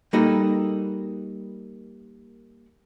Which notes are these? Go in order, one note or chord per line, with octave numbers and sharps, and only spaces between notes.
G3 A#3 D#4 F#4 A4 D#5